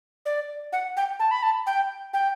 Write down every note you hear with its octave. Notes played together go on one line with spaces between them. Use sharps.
D5
F#5
G5
A5
B5
A5
G5
G5